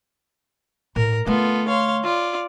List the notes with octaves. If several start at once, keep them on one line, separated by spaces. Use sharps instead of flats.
A2 A#4
D3 A3 B3 F4 A4
C#5 F5 C6
F4 D5